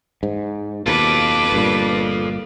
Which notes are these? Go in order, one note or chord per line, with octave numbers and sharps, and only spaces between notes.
G#2
D#2 B2 F4 A4 B4 D6
G1 G2 A#2